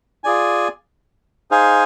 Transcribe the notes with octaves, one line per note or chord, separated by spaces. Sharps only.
F4 G#4 D5 G#5
D#4 G#4 C5 F5 G#5